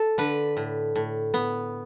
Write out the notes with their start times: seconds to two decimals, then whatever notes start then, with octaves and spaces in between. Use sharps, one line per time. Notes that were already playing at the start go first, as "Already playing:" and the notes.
Already playing: A4
0.18 D3 B4
0.57 A2
0.96 A2
1.34 B3